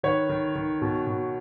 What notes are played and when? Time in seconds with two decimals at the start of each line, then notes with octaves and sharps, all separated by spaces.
0.03 D#3 B4 C#5
0.29 D#3
0.55 D#3
0.82 B2
1.07 B2